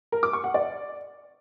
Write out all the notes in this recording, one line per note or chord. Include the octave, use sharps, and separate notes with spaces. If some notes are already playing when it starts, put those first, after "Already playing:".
A#4
D6
C#6
F#5
D5